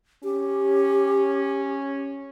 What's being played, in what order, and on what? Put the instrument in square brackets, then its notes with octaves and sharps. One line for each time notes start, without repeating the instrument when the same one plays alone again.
[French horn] C#4 [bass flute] G4